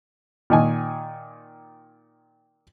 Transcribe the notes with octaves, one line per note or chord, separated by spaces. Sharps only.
A#2 D#3 G#5